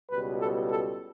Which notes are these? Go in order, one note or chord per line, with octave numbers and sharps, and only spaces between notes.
C#2 B2 G3 B4
A4
A4